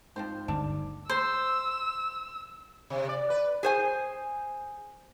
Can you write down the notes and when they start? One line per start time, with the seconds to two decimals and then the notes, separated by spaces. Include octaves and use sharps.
0.16 G#2 F3 C4 C5
0.48 G1 D2 D4
1.09 C5 E6
2.90 C3
3.09 D5
3.30 B4
3.63 G#4 C5 G#5